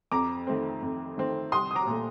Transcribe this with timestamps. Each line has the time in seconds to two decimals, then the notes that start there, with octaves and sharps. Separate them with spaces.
0.12 F2 A#5 D6
0.47 D#3 A3 C4
0.82 F2
1.17 D#3 A3 C4
1.52 C2 C6 D#6
1.71 D#6
1.75 A#5 D6
1.87 A#2 A3